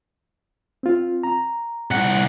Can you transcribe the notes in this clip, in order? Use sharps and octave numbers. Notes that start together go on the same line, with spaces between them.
C4 F4
A#5
C2 F#5